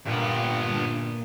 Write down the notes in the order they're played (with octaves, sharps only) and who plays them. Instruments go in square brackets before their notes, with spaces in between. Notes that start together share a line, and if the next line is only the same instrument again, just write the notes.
[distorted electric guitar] G2 B3 [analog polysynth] A#2